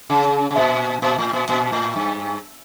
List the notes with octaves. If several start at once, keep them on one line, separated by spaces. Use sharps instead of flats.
C#3
C#3
A#2
A#2
A2
A#2
A#2
A2
G2